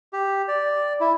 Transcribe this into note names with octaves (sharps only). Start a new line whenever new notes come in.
G4
D5
E4